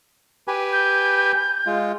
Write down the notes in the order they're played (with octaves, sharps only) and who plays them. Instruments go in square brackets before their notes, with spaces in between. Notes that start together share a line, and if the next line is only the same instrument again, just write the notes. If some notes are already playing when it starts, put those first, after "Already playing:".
[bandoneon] G4 B4 G#5
[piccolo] G6
[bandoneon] G#3 F4